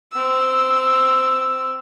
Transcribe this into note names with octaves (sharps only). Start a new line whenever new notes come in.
C4 E6